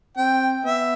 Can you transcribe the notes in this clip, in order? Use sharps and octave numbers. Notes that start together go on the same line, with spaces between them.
C4 G5
B3 E5